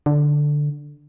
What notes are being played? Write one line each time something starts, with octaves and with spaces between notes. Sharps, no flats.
D3